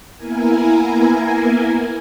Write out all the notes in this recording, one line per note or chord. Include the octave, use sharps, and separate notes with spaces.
A#3 B3 E4 A#4 G#5